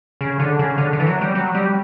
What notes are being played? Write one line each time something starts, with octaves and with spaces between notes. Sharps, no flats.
C#3
D3
C#3
D3
D3
E3
F#3
G3
F#3
G3